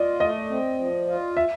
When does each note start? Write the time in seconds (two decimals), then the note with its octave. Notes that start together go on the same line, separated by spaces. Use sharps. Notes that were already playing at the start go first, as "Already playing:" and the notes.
Already playing: F4 D5 D#5
0.20 A3 D#5
0.50 C4
0.79 F3
1.07 F4
1.37 E5